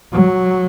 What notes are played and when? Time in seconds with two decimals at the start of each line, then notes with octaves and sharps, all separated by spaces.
0.12 F#3